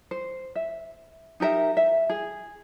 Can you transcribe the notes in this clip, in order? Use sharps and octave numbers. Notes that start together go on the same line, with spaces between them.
C5
E5
D#4 G4 A#4 E5
E5
G#4